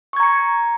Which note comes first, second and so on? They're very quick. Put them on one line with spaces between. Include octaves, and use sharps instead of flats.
C#6 G#6 A#5 C#7